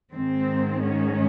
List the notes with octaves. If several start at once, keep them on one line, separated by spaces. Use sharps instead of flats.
G#2 D#3 G#3 C4
C#4